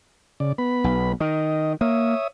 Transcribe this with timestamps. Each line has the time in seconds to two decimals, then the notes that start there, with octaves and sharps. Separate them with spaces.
0.40 C#3 D5
0.58 B3 B5
0.84 B1
1.20 D#3 D#5
1.81 A#3 C#5 E5 D#6